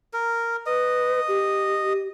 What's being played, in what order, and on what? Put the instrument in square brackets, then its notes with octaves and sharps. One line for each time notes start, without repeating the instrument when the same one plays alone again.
[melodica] A#4
[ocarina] B4 [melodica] D#5
[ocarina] G4